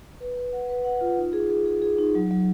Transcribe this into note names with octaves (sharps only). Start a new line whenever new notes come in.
B4
B4
F#5
B4
F#5
F4
D#4
G#4
G#4
G#4
G#4
D#4
F#3
F#3